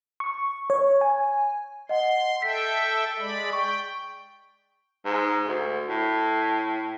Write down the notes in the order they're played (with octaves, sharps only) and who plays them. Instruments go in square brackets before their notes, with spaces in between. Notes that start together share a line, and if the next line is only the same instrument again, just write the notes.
[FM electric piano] C#6
C#5
G#5
[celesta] D#5 F#5 [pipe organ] C6
[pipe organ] A4 E5 G5 [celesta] B6
[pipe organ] G#3 D5 B5
[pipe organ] G5 [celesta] C#6
[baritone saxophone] G#2
D2
A2